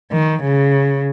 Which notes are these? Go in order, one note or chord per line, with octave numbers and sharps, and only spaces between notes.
D#3
C#3